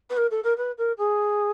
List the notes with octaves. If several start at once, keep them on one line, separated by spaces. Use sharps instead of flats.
B4
A#4
A4
A#4
B4
A#4
G#4